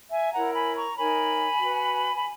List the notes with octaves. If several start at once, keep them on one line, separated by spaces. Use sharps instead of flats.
E5 G#5
E4 A#4 C#5 F#5 A#5
G#5 B5
A#5 C#6
D#4 A#4 C#5 G#5 B5
F#4 B4
B5